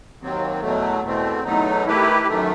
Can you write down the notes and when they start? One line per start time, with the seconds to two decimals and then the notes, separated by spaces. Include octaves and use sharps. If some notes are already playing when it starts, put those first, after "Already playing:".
0.19 D#2 D#3 F#3 C4
0.61 E2 B2 F#3 A3
1.02 E2 B2 A3 C4
1.44 E2 B2 F#3 A3 D#4
1.85 D#3 A3 E4 G4 B4
2.27 F#2 D#3 A3